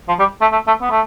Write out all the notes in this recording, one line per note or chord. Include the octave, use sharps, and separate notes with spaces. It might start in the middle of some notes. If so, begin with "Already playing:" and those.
F3
G3
A3
A3
A3
B3
A3